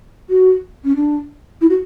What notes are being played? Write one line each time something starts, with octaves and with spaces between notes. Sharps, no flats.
F#4
C#4
D4
E4
F#4